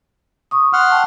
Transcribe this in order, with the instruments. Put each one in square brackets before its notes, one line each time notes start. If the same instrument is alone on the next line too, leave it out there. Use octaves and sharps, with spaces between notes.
[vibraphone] C#6 D#6
[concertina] F#5 C6 F6
[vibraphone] G5 A5 C#6